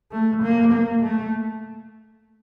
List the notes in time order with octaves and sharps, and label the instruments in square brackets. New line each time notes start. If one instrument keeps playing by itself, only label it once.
[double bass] A3
A#3
A#3
A3